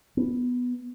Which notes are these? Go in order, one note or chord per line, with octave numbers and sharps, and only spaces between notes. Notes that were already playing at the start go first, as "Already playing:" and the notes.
B3